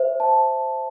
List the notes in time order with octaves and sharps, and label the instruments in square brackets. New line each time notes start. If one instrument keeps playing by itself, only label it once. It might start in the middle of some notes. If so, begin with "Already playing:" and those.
Already playing: [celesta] C5 E5
A5